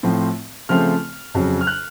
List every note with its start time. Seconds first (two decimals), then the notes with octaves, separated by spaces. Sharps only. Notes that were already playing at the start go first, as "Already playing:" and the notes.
0.03 A2 F3 C4
0.69 C#3 F3 A3 C4 F6
1.35 F2 C#3 F#3
1.61 F6
1.67 F#6